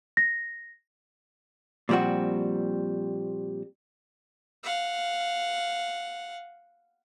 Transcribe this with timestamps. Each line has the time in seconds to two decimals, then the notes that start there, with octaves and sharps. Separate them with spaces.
0.17 A#6
1.89 A#2 F3 G3 C4 F#4
4.63 F5 F#5